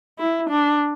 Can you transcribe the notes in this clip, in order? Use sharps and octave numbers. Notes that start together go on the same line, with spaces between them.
E4
D4